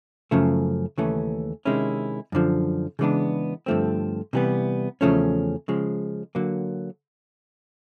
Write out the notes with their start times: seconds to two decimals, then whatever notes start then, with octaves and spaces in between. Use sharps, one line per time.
0.31 F#2 C#3 F3 A3
0.98 D#2 C#3 E3 A3 C#4
1.65 C3 D#3 G#3 C#4 E4
2.32 F#2 D3 F3
2.99 C#3 E3 G#3 B3 D4
3.66 G2 D3 F3 A3 C4
4.33 C3 E3 G3 B3
5.01 E2 C#3 F3 A3 C#4
5.68 C#3 F3 G#3
6.35 D3 F#3 A#3